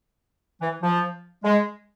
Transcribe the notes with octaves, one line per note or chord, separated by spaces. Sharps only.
E3
F3
G#3